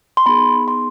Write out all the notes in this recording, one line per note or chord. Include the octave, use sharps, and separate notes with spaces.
C6
B3 D#4 G#4 B5
C6